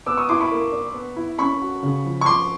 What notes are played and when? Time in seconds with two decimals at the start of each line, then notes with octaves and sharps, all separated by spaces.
0.06 B3 D6 E6
0.17 C#6 D#6
0.29 E4 C6 D6
0.40 B5 C#6
0.51 A#3
0.72 D4
0.94 B3
1.16 E4
1.38 C#4 B5 C#6
1.61 F#4
1.83 C#3
2.05 F3
2.21 C#6
2.26 F3 C6 D6